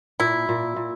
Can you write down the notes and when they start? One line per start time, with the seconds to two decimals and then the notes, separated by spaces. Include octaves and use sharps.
0.20 A#2 E4
0.49 A#2
0.76 A#2